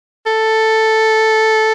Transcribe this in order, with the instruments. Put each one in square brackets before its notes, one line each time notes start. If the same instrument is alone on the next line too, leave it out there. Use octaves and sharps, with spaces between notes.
[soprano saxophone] A4